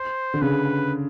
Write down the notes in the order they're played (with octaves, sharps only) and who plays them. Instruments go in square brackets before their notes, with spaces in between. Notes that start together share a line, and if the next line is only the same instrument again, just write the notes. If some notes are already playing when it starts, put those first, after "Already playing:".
Already playing: [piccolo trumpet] C5
[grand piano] D3
[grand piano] C#3 [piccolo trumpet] B4